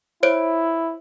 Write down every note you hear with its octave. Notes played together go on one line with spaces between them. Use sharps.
E4 C5 C#5 D7